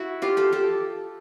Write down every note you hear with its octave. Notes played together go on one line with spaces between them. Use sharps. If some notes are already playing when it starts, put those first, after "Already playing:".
Already playing: E4 F#4
F4 G4
G4 A4
G4 A4